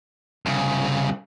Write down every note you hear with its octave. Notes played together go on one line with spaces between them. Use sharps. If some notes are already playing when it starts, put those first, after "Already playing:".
C2 C#3